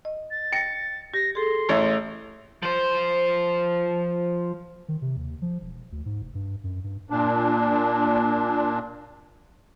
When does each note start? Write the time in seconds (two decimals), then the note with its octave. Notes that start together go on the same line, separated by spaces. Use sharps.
0.05 D#5
0.31 A6
0.52 G5 A#6 C#7
1.14 G4 A#6
1.35 G#4 A4 C6
1.69 A1 C#5 E5
2.63 F3 C5
4.88 D#3
5.02 C3
5.16 D#2
5.42 F3
5.61 E1
5.92 D2
6.06 G#2
6.22 F1
6.35 G2
6.64 F#2
6.84 G2
7.10 A#2 D4